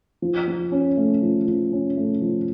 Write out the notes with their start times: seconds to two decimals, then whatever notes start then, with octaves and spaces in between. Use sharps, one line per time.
0.22 F3
0.48 F3
0.72 C#4
0.97 A3
1.22 F3
1.47 F3
1.73 C#4
1.97 A3
2.22 F3